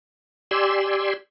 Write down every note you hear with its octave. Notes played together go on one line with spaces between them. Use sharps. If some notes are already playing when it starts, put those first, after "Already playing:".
G4 D5 G#5 C6 E6